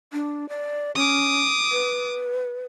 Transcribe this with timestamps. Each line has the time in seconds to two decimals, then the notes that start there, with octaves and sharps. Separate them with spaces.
0.12 D4
0.49 D5
0.96 C#4 D6 D#6
1.71 B4